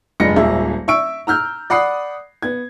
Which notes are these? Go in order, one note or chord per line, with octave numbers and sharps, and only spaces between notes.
F1 G2 G#3 A#6 C#7
D#1 G#1 G#4 E5
E5 C#6 E6 D7
A#5 E6 F6 G6
D5 F#5 B5 D#6 C7
B3 G#6